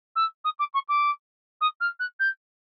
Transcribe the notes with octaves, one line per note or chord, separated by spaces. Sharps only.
E6
D#6
D6
C#6
D6
D#6
F6
F#6
G6